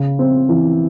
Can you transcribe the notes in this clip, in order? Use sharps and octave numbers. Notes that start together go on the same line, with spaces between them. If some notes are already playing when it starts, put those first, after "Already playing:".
Already playing: C#3
C4
E3